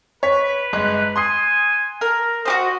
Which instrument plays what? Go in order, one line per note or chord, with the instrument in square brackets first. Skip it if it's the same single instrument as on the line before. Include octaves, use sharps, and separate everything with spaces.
[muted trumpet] B4 [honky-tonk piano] C#5 B6
[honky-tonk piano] G1 G#3 F#6
[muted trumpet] G#5 [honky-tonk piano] C6 D#6 C7
[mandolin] A#4
[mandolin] F#4 G4 C5 [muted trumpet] D#5